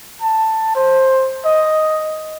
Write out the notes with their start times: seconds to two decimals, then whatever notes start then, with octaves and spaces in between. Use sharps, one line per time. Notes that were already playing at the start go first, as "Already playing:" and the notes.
0.21 A5
0.76 C5
1.45 D#5